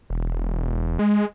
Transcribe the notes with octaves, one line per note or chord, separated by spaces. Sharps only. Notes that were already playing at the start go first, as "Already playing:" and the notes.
E1
G#3